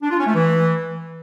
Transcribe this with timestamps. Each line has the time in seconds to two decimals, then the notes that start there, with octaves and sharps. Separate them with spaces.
0.03 D4
0.11 F4
0.19 C#4
0.27 A3
0.35 E3